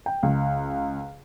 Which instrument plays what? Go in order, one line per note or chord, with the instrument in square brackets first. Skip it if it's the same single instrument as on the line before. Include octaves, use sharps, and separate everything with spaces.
[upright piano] G5
C#2